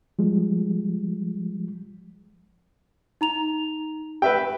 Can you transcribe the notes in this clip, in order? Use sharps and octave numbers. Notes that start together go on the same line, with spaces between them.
F3 G3 G#3
D#4 A#5 F7
G4 B4 E5 G5